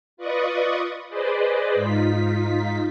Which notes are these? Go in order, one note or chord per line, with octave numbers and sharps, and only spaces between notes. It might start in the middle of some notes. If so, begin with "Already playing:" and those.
F4 B4 D5 D#5 C#6 D#6
G#4 B4 C5 D5 D#5
G#2 D#4 F4 B6